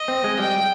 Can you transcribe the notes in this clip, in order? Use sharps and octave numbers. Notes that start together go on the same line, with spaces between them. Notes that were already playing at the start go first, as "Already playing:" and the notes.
Already playing: D#5
C4
G#3
G3 G5